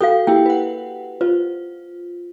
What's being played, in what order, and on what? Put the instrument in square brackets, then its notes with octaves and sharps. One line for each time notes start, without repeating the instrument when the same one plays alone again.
[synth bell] F#4 G5 [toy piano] A4 F5
[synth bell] A#3 E4 G4 [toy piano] G5
[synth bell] B4 F#5
[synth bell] F4 [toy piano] C5